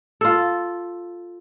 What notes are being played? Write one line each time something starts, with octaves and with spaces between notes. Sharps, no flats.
F4 A4